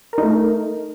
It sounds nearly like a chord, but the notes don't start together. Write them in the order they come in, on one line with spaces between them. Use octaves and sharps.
A#4 D#4 A3